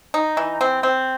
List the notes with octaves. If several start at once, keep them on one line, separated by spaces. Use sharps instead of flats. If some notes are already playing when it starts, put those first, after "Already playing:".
D#4
E3
C4
C4